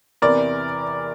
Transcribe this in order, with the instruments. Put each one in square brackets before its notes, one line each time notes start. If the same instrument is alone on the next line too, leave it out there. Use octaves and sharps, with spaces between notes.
[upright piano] E2 C3 E3 A#4 D5